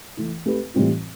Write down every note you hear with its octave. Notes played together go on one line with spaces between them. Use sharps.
E3 A3 E4
A3 C4 G4 B4
A2 E3 G3 C4 F4